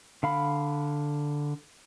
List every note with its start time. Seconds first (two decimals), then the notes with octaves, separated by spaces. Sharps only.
0.23 D3 F5 B5